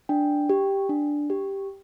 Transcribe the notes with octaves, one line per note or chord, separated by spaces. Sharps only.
D4 G5
G4
D4
G4